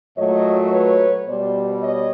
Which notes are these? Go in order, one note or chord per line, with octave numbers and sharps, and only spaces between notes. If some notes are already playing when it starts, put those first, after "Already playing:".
A#2 F#3 A3 C#5 D#5
B4 C#5
B2 G3 C5 D5
C#5 D#5